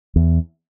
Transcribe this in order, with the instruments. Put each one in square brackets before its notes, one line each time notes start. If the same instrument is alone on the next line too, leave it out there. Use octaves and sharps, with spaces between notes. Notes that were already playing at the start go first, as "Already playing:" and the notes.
[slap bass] E2